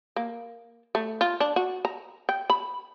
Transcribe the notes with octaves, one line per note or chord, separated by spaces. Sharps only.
A#3
A3
F4
D4
F#4
A#5
G5
B5